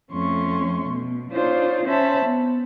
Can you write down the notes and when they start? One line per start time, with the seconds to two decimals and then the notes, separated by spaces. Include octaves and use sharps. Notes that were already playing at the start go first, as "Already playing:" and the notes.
0.12 F2 A3 C#4 C6 C#6
0.88 B2
1.31 D4 D#4 F4 C5 C#5
1.85 C#4 C5 C#5 E5 A5 B5
2.24 B3